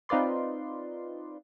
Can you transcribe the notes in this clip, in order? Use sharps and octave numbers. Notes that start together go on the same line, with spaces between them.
C4 D#4 F4 B4 D5 C6